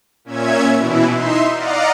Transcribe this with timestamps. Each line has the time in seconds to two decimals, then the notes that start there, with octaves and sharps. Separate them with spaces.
0.25 A#2 C#4 E5 G#6
0.74 B2 E3 E4
1.11 D#4 E5 C6
1.54 D5 D#5 F5 F#5 A#5